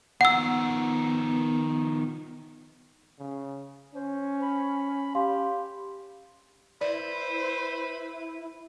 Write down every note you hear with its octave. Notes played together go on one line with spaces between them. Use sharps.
D#3 F3 B3 F#5 E6
C#3
C#4 C5
B5
G4 F5 C6
E4 B4 C5 D5